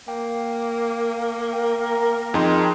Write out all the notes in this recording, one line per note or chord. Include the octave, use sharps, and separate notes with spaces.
A#3 G5
A#4 G5
F2 D#4 G#4 G5 C6